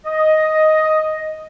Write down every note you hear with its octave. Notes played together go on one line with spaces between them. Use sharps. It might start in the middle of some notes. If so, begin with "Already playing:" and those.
D#5